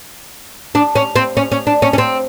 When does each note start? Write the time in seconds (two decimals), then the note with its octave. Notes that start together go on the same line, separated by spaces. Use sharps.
0.75 D4
0.95 C#4
1.16 C4
1.37 C#4
1.52 C#4
1.67 D4
1.82 C#4
1.93 C#4
1.98 C4